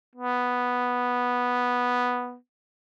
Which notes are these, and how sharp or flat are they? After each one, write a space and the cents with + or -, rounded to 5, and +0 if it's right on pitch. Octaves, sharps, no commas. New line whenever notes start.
B3 -5